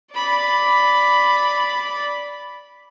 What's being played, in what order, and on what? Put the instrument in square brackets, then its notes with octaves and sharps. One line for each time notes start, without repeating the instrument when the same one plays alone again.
[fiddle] D5 B5